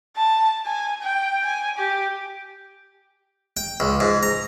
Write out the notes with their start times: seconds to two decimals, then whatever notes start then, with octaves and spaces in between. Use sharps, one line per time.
0.16 A5
0.66 G#5
1.02 G5
1.46 G#5
1.77 G4
3.57 G5
3.80 C#2
4.00 G#2
4.23 A#5